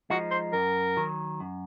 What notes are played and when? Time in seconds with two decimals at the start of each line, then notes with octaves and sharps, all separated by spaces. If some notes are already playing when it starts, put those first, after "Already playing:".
0.10 F3 G#3 D#4 F#4
0.31 C5
0.53 F#2 A#4
0.96 D#3 F#3
1.40 F#2